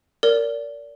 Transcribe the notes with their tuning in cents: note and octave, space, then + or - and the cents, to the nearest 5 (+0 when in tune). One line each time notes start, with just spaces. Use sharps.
A#4 -15 D5 -30